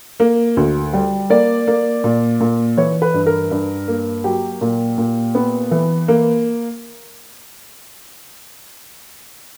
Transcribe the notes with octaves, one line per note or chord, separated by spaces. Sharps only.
A#3
D2
G3
A#3 D5
A#3
A#2
A#2
E3 C#5
B4
G2
A#4
G2
A#3
F#3 G4
A#2
A#2
B3
E3
A#3